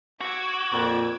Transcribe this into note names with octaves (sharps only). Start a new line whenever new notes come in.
F#4 D6 E6 G#6
F2 A#2